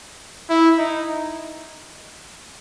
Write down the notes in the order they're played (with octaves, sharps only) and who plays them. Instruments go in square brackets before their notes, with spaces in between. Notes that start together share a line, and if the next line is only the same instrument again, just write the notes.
[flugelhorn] E4
D#4